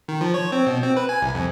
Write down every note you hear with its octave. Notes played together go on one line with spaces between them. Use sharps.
D#3
F3
C#5
C4
B2
C4
B4
G#5
C2
F2